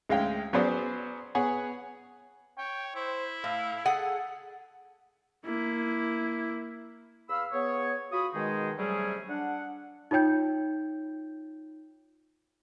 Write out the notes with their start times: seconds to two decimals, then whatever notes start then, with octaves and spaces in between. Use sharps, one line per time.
0.09 D2 G#3 C#4 F5 G5
0.53 F#3 B3 C#4 G#4 C5 D5
1.35 B3 G#4 C#5 F#5 G#5
2.58 C#5 G5
2.95 E4 C5
3.44 A2 F5
3.85 G#4 A4 F#5
5.46 A#3 E4
7.29 E2 F5 B5 E6
7.53 B3 G#4 C#5
8.11 F4 F#4 B5 D#6
8.34 B2 D#3 G#3 D#4 G#4
8.78 C3 F#3 G3 A3 C#4 G#4
9.29 D4 F#5
10.11 D#4 F4 C#5 G5 G6